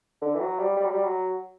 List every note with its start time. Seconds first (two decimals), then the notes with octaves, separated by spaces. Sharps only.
0.22 D3
0.35 E3
0.41 F#3
0.59 G3
0.77 G3
0.85 F#3
0.92 G3
1.04 F#3